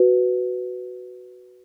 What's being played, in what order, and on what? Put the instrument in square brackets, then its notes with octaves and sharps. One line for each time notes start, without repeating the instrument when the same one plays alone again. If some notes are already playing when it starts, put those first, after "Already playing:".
Already playing: [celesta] F#4 B4